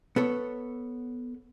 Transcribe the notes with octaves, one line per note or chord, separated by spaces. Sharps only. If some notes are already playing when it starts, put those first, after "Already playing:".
B3 A4 C#5